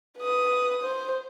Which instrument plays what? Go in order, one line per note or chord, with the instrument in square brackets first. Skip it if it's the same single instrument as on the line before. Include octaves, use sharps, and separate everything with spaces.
[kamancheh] B4 D#6
C5